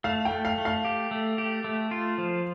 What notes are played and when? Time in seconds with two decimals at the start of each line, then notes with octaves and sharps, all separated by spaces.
0.04 A3 F5
0.25 G5
0.31 A3
0.45 F5
0.58 A3
0.65 F5
0.85 G4
1.11 A3
1.38 G4
1.64 A3
1.91 F4
2.18 F3